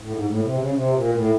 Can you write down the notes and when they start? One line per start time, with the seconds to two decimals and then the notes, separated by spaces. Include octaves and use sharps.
0.02 A2
0.13 G#2
0.27 A2
0.42 C3
0.57 C#3
0.73 C3
0.92 A#2
1.13 A2